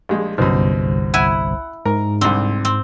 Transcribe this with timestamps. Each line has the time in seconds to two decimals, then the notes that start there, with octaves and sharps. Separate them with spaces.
0.09 A#1 G3 G#3
0.38 G1 C2 F#2 B2 C5
1.14 E4 F#5 G#5
1.85 G#2 A#4
2.21 C2 D3 C4
2.65 C4